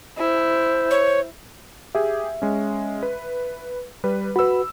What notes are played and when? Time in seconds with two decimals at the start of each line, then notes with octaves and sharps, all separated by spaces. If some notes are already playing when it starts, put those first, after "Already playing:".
0.18 E4 C5
0.90 C#5
1.95 G4 G#4 E5
2.42 G#3 C#4
3.03 B4
4.04 G3 B4
4.36 F#4 B4 B5 E6